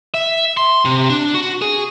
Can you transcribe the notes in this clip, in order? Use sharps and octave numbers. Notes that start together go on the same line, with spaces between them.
E5
C6
C3
D4
F#4
G#4